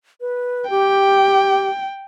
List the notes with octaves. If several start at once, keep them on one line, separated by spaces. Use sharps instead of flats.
B4
G4 G5